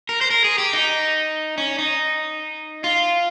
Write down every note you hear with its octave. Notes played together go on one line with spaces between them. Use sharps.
A#4
C5
A#4
G#4
G4
D#4
C#4
D#4
F4